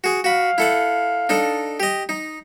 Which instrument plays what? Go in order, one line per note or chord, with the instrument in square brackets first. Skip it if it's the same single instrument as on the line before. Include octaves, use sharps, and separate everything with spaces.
[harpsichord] F#4 G#4
[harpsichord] F#4 B5 [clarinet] F5
[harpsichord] E4 A4 F#5
D4 D#4 A4
G4 D#5
D#4